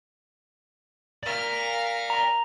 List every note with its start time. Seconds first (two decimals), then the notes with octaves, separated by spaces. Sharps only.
1.23 A#4 D5 F5 F6
2.10 A#5